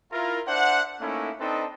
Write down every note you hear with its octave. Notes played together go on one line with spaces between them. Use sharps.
E4 F4 A#4
D4 C5 E5 F#5
A3 A#3 C#4 D#4 E4
C4 D4 D#4 A4 B4 D#5